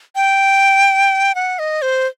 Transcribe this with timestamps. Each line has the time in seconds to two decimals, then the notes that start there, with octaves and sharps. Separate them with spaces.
0.15 G5
1.35 F#5
1.59 D#5
1.82 C5